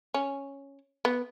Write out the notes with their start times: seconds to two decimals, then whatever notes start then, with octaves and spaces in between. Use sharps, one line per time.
0.14 C#4
1.05 B3